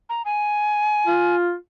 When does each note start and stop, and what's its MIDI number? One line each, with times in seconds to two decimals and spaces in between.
0.09 0.22 82
0.25 1.36 80
1.07 1.54 65